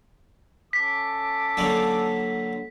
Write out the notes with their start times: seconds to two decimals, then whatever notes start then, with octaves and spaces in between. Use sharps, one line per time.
0.73 C#4 A4 D6 B6
1.57 D3 F#3 A#3